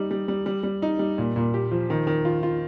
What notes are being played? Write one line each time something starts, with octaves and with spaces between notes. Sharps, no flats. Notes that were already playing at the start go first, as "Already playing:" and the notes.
Already playing: G3 D#4
G3
G3
G3
G3
D#4
G3
A#2
A#2
G4
F3
D#3
D#3
F4
F4